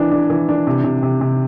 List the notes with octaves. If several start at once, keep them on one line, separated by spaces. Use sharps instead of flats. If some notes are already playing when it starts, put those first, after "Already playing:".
Already playing: E3 D4
D4
E3
D4
C3
C3
C3
C3